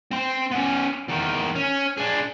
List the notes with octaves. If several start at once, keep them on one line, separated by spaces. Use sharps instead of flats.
C4 C6
B3 C#4
E2 D#3
C#4
D4 G#4